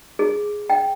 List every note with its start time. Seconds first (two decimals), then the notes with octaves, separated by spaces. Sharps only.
0.19 G#4
0.70 G5